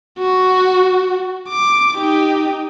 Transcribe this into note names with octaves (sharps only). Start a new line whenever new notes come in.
F#4
D6
D#4 G4